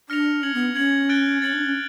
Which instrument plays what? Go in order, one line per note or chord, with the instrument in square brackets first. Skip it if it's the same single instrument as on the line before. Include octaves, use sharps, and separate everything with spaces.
[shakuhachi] D4 [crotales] F6 A#6 C#7 F7
[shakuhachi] C#4 [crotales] G#6 C#7 F#7
[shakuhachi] B3
[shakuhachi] C#4 [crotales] G#6 C#7 F#7
[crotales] F#6 A6 D7 G7
[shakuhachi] C#4 [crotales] A6 C#7 F#7
[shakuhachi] D4
C#4